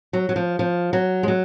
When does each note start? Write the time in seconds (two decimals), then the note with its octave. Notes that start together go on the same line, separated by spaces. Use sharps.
0.13 F#3
0.29 F#3
0.36 F3
0.59 F3
0.93 F#3
1.23 G#3
1.28 F#3